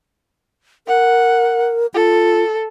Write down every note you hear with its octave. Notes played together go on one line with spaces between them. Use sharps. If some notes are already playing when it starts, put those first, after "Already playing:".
A#4 F#5
F4 A4